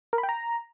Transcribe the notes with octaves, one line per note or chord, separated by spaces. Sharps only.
A#4
B5
G5
A#5